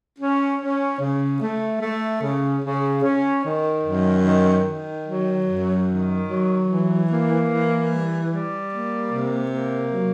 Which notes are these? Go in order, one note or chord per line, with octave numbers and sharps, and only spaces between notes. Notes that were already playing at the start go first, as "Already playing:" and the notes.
C#4
C#4
C#3
A3
A3
C#3
C#3
C#4
D#3
F#2
D#3
D#3
F#3
F#2
D#3
F#3
E3
A#3
E3
G3
G3
A#3
C3
A#3
F#3